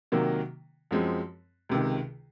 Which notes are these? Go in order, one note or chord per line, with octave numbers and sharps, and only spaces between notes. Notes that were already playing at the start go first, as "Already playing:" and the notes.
C3 D#3 F#3 A#3
F#2 F3 G#3 C4
C#2 C3 D#3